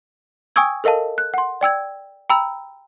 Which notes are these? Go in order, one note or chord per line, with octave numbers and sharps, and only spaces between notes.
G5 G#5 C#6 D#6 E6 G#6
A4 A#4 D#5 F5 A5
F#6
F#5 C6
D5 G5 E6 G#6
G5 A#5 B5 E6